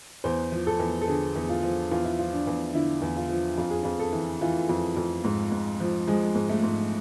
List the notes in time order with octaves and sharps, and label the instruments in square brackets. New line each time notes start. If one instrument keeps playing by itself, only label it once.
[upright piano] E2 C5
F3
A4
E2
A4
D3 G#4
E2
F4
F3
E2 F4
E4
F3 F4
D4
E2
D3 E4
E2
F4
F3
F2 F4
G#4
F2 F4
A4
E3
E3 F4
F2
F2
G#2
G#2
F3
F3 G#3
G#2
A3
G#2